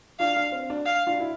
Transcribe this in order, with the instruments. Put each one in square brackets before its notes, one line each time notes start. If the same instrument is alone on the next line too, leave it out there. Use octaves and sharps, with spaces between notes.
[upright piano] D4 F4 [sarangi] F5
[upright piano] D4
C4
D4
[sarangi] F5
[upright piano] D4 F4
E4